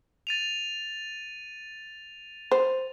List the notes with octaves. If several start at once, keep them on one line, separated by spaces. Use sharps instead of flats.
A6 D#7 F7
C5